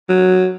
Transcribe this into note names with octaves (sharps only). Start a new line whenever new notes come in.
F#3